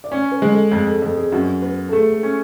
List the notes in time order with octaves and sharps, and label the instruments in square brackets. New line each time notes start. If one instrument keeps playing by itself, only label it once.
[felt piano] D5
[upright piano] C#4 [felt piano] C#5
[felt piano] B4
[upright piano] G#3
[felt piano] A4
[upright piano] F2 [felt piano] G#4
[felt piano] A4
[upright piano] F2 [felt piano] A4
[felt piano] G#4
[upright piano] F#2 [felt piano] F#4
[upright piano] B3
[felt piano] A4
[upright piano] A3 [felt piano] G#4
[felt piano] A4
[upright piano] C#4